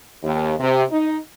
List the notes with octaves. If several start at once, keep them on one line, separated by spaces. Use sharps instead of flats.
D#2
C3
D#4